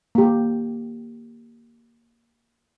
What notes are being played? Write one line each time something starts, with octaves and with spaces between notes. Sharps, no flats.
A#3 G4